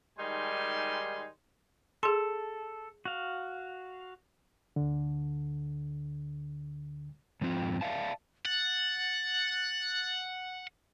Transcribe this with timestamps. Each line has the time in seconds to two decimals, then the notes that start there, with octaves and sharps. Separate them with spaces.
0.18 D#3 G3 G#3 D#4 G#5 C6
2.03 G#4 A4 C6
3.05 F#4 F5
4.76 D2 D3
7.41 G#2 F3 C4 F4
7.81 D5 E5 F5 A5
8.45 F#5 A6